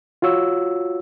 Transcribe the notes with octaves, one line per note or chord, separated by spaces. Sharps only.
F4 F#4 C#5 E6